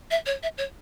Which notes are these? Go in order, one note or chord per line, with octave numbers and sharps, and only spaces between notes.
E5
C#5
E5
C#5